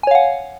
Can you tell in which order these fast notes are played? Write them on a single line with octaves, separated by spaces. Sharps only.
G#5 C#5 F5 F#5